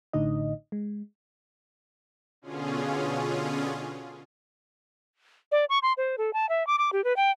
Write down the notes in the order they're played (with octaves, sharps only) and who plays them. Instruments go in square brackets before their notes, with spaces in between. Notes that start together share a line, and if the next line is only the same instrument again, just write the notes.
[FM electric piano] A1 A2 D3 D#4 D#5
G#3
[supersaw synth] B2 D3 C#4 F4 G#4
[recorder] D5
C#6
C6
C5
A4
A5
E5
D6
D6
G4
B4
G5